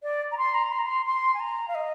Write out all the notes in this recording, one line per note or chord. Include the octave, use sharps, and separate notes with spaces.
D5
A#5
C6
A#5
C6
A#5
C6
C6
G#5
A#5
F5
D#5